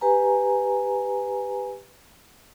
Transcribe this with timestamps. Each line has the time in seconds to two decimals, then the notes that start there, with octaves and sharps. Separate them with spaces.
0.01 G4 B4 G#5 A#5